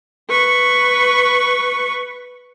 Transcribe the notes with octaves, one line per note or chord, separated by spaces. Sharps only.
B4 C#6